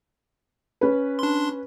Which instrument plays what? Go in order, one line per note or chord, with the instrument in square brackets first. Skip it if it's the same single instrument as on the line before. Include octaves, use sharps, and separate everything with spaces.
[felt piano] C#4 B4
[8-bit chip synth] D4 C6